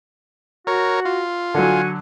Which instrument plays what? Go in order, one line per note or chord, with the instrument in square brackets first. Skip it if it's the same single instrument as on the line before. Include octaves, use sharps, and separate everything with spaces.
[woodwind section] F#4 [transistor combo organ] A#4 C#5
[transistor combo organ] F4
[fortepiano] D3 F#3 [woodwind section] F#4 F#5 G#5